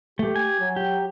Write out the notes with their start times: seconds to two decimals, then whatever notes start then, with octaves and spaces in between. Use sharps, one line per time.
0.19 A3 G4
0.36 G#5
0.60 F#3
0.76 G4